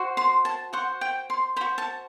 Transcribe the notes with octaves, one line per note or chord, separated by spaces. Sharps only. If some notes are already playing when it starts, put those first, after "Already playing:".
Already playing: F#4 C5
C6
A5
F#4 C5 F#5
G5
C6
F#4 C5 B5
A5